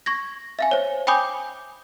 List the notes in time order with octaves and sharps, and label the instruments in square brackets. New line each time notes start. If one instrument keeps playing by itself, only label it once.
[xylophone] C#6 G#6 A#6
E5 F5 G#5
C5 C#5
G5 G#5 B5 D6 D#6 G6